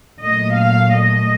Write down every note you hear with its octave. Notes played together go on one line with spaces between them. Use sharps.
A#2 F#3 A3 D#5
F5
D#5